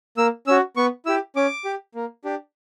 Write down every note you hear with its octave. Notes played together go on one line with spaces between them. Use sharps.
A#3 E6
C#4 F#4 E6
B3 C#6
E4 G4 E6
C#4 D6
G4
A#3
D4 G4